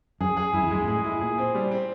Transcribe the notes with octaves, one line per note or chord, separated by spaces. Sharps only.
F#2 G#4
G#4
F#2 E4
F2
F#2 G#3
G#2
A2 G#4
E4
A#2 G#4
C4
G3
C4